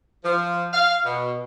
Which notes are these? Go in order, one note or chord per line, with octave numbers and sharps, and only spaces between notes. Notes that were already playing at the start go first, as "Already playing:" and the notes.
F3
F5
B2